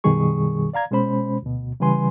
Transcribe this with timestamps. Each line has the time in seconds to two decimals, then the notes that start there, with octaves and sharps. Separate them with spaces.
0.04 F#2 B2 D#3 G3 G#4 C#6
0.73 D5 F5 A#5 G#6
0.91 B2 G#3 C#4 C5 B5
1.42 D2 B2
1.80 C#3 E3 G3 B4 G#5 C6